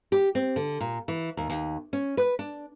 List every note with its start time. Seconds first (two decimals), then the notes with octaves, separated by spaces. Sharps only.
0.12 G4
0.35 C4
0.56 D3
0.80 A#2
1.08 E3
1.37 D#2
1.50 D#2
1.93 C#4
2.17 B4
2.39 D4